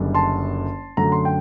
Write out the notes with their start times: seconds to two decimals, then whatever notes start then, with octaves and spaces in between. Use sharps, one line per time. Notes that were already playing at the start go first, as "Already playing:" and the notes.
Already playing: F#1 F#2 D3 G3 D4
0.14 A5 C6
0.97 F#2 D3 F#3 A3 A#5
1.12 C6
1.25 G5